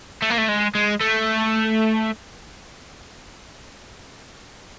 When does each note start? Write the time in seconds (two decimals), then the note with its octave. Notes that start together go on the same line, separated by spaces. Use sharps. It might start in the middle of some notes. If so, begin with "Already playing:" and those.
0.22 A3
0.30 A#3
0.38 A3
0.49 G#3
0.75 G#3
1.01 A3